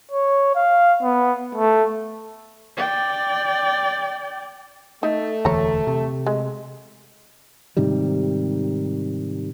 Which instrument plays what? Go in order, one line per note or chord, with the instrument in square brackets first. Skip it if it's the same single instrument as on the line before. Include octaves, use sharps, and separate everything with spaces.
[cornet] C#5
F5
B3
A3
[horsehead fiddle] D5 G5
[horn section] A3 [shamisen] D#4
[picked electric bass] E1 D2 E3 [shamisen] C#5 A#5
[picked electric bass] C3
[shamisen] G#3
[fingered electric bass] G#2 C3 D#3 G3